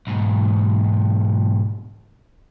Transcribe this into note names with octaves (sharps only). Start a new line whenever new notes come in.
B1 G#2